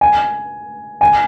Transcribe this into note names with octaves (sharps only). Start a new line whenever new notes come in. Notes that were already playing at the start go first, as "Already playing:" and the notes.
G#5
G#5